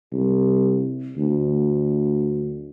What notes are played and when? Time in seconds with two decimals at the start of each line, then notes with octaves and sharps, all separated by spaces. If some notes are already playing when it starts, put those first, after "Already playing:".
0.13 C2
1.17 D2